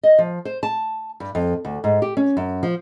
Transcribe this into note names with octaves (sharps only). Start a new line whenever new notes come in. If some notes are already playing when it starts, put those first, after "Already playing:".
D#5
F3
C5
A5
G2
F2
D2
G#2
G4
C#4
F#2
F3